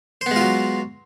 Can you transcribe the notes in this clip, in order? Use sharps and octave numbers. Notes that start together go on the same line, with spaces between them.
F#3 G#3 B3 F4 C5